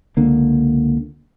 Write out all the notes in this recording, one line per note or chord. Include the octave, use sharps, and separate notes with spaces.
C#2 D3 A#3